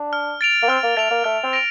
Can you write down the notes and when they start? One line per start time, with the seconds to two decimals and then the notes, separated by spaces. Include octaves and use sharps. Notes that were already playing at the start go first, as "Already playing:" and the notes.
Already playing: D4
0.13 F6
0.41 A6 D7 F7
0.62 A#3
0.68 C4 F6
0.83 A#3
0.97 A3 A6 D7 F7
1.11 A#3
1.24 A3 F6
1.44 C4
1.53 A#6 D7 F7